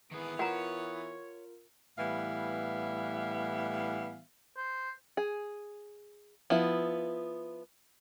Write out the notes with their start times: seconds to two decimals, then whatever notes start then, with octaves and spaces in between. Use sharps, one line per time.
0.12 D#3 E3 B3 G#4
0.39 F4 A#4 C#5 F#5 A#5
1.99 A2 E3 G3 B3 E5 F5
4.57 C5
5.17 G#4
6.50 F3 B3 E4